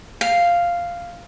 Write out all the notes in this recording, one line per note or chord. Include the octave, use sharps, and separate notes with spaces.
F5